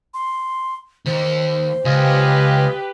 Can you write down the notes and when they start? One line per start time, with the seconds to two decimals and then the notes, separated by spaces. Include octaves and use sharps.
0.14 C6
1.06 D#2 C5
1.85 C#2 F4 G4 B4 D#5 G#5